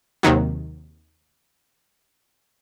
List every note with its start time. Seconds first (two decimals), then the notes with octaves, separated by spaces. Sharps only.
0.23 D#2 C3 D#3 F#3